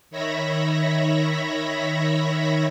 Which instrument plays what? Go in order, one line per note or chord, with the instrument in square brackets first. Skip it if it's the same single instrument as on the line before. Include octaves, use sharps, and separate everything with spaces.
[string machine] D#3 C#5 E5 B5 A#6